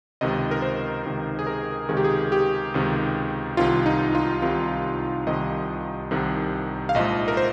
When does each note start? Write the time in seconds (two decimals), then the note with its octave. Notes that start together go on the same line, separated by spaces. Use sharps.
0.21 C#2 C3 D#3 D#5
0.51 A#4
0.62 C5
1.05 C#2 C3 D#3
1.39 G#4
1.47 A#4
1.89 C#2 C3 D#3 G#4
1.97 G4
2.04 G#4
2.32 G4
2.74 C#2 C3 D#3
3.57 C2 C3 D#3 F4
3.86 D#4
4.15 F4
4.42 C2 C3 D#3 F4
5.26 C2 C3 D#3 D#5
6.11 C2 C3 D#3
6.89 F5
6.95 A#1 G#2 F3 D#5
7.28 A#4
7.37 C5